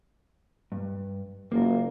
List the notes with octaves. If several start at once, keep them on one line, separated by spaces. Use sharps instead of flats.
G2
F#1 A#3 F4 A#4